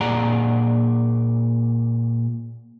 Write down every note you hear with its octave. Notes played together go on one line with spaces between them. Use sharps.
A#2 G#4 D5 F#5 A#5